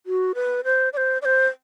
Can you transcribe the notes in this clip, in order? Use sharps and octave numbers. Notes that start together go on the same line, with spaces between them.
F#4
B4
C5
D5
C5
D5
C5